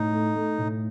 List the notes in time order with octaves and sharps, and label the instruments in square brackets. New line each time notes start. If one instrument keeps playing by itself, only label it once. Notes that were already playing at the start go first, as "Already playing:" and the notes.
Already playing: [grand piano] A2 [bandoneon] D#4
[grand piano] A3
A3
A2